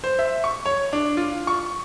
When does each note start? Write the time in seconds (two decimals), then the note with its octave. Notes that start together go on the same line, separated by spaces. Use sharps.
0.04 C5
0.19 E5
0.44 C#6
0.66 C#5
0.93 D4
1.17 F4
1.47 C#6